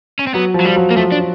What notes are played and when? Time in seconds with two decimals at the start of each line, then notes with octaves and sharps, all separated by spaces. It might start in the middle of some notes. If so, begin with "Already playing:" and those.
0.19 C#4
0.27 C4
0.34 F#3 B3
0.54 F3
0.60 F#3
0.65 F3 G3
0.76 F#3
0.90 A#3
0.96 F3 A3
1.12 D4